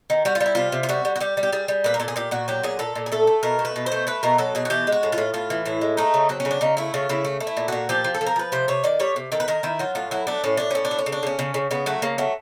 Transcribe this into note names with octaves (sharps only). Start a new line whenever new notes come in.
D#3
G3 F#4
F4
G3
E4
C3 F4
C3
F4
G3 F#4
G3
F#4
G3 G4
G3
G4
G3 G#4
G3
A#2 B4
A#4
A#2 A4
G#4
A#2 G4
A#2 F#4
F#3 G4
A#2 G#4
A#2 A4
A#2
G#4
A3 A4
A3
B2 A#4
A3
B4
B2
C5
A3
A3 B4
B2 A#4
F#3 A4
B2 G#4
F#4
E3 G4
G#3
F#4
A2
F4
A2
A2 F4
E3
A2 E4
G#3
A3 D#4
C#3
F#3 C4
C#4
C#3
D4
C#3 D#4
A3 E4
C#3 F4
C#3 E4
A3
A3
E4
A#2
A#2 F#4
F3 G4
F3
A4
F3
A#4
F3 B4
C3 C5
C3 C#5
D#3 D5
G3 C#5
C3
D#3 A4
B4
D#3 A#4
D#3 E4
F#3 F4
A2 F4
F#3 E4
A3 D4
A2 C#4
A2 D4
A2 C#4
D4
A3
C#4
C#3
D4
C#3 C#4
C#3
C#3
C#3 B3
F#3 A3
C#3 A#3
F#3 A3